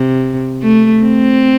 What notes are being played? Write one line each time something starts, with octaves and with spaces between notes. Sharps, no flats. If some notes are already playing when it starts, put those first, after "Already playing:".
Already playing: C3
A3
C4